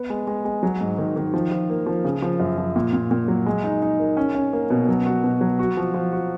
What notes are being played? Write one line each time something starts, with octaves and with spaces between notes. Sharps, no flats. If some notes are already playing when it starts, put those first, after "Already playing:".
Already playing: B3
G#3
G#3
G#3
F#3
G#2
D#3
D#3
F3
F3
A#3
F3
C#3
F3
F#2
F3
A#2
A#2
A#2
F#3
G#3
D#4
D#4
A#4
C#4
C#4
A#3
B2
F#3
F#4
B2
F#3
F#4
F3
F3
F#4